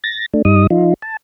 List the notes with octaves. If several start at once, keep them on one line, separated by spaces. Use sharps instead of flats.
A6 A#6
A3 D4
G2 G3 D#4 D#6
F3 D#4 F4
A5